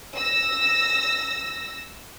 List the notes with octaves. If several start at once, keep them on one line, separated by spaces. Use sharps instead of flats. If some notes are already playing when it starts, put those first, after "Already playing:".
E6 A#6